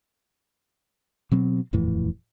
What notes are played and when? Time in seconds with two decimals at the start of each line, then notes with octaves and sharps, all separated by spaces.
1.32 B2 F#3 C4
1.73 D#1 F2 A2 E3